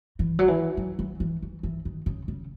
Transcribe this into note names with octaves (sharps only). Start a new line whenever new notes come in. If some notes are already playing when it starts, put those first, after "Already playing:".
E3
F#3
E3
F#3
F#3
E3
E3
E3
D#3
C#3
C#3